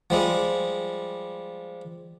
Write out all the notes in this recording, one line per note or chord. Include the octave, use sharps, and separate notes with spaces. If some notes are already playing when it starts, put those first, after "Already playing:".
F3 G3 G#3